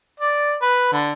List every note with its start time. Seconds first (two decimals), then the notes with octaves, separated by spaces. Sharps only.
0.20 D5
0.62 B4
0.93 D3